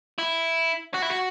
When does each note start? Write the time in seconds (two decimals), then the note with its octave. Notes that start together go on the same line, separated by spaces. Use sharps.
0.18 E4
0.94 F#4
1.02 E4
1.10 F#4